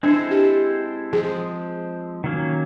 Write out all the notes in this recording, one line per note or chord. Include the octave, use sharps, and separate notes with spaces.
G#3 C4 D4 E4 A4 C5
G4
F3 G#3 C4 G#4
D#3 F#3 A#3 C#4